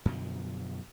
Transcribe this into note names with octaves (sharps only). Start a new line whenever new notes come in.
F#2 B2 D3 F3